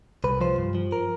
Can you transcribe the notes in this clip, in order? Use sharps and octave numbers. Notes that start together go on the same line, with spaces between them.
C2 B4
F3 C5
G2
F3
A#4